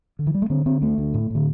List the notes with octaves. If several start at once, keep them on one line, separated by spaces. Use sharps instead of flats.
D3
E3
G3
A3
D3 C4
D3 C4
D2 A3
D2
A2
A2 D3